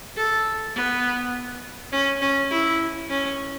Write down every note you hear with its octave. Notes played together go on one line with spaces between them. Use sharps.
A4
B3
C#4
C#4
E4
C#4